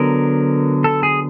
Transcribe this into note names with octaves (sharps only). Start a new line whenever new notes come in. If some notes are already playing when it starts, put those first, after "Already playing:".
Already playing: D3 F#3 B3 A#4
A4
G#4